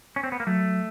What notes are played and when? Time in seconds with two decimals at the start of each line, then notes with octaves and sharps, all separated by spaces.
0.16 C#4
0.24 C4
0.32 B3
0.40 A#3
0.47 F#3 A3